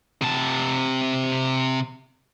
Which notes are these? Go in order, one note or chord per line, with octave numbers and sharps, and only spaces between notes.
C3 A5